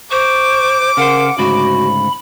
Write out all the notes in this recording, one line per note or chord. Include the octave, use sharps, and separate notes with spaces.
C5 C#6 D6
C#3 A#4 C5 F#5
D2 G#2 C#3 F#4 B5